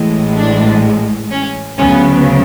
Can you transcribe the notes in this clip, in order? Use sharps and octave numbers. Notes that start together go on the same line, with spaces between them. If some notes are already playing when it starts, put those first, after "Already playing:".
Already playing: A1 A2 E3 G#3
D4
C#4
D2 C#3 F#3 B3 C#4